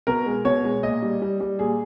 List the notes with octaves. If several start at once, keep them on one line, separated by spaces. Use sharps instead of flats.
B2 A#4
G#3
B2 C#5
G#3
A#2 D#5
G3
G3
G3
A#2 G#4